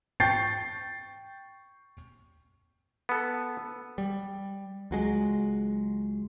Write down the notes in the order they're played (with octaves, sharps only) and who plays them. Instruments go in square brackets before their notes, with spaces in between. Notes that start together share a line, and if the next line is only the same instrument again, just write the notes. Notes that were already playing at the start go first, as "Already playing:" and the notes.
[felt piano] G5 C#6 G6 A6 C7
[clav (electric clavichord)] B3 A4
[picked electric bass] G3
C#2 F#3 G#3